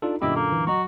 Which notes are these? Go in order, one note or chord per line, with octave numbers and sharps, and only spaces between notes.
D4 D#4 F4 A4
F#2 A#2 D3 E4 G4 D#5 D6
A#3 A4
E3
F#3 F#4 D#5 A#5 C#6